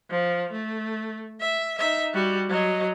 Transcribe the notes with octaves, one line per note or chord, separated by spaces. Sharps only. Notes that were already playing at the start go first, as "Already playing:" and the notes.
F3
A3
E5
D#4 E5
G3 F#4
F#3 D#5